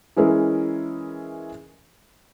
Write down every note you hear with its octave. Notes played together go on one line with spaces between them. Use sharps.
E3 G#3 C#4 E4 G#4 A#4